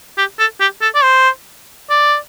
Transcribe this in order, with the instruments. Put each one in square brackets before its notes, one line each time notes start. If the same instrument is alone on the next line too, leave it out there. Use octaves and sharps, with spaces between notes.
[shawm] G4
A4
G4
A4
D5
C5
D5